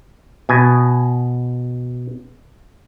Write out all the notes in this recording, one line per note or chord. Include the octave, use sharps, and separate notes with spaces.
B2 G#5